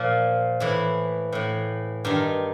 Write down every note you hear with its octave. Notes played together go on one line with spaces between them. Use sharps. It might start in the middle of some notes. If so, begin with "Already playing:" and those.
Already playing: A#2 F3
A2 E3 E4
A2 E3
G2 D#3 D#4